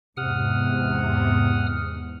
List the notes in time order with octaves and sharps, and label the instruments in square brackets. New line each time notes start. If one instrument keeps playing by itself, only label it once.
[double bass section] E2 G#2 [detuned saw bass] C3 [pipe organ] F#5 D#6 F6